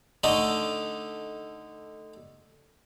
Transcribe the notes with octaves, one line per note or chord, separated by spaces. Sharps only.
D3 A3 D#4